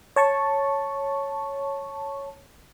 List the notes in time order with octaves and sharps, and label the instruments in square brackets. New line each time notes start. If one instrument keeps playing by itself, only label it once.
[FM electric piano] C#5 A5 C#6